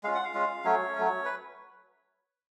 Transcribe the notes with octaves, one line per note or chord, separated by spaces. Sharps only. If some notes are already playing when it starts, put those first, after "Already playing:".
G#3 C#4 F4 F5
F#5
F5
G#3 C#4 F4
F#3 A3 C#4 C#5
F#3 A3 C#4
B4